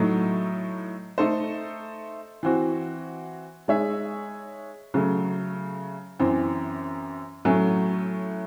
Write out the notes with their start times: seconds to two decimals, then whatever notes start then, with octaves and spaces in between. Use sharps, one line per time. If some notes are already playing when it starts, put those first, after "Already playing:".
Already playing: A2 F#3 A3 D#4
1.18 A3 D#4 A4 C5
2.43 E3 C4 F#4
3.68 G#3 D#4 G#4 C#5 E5
4.94 C#3 F#3 A3
6.19 F#2 E3 C4
7.45 A2 F#3 A3 C#4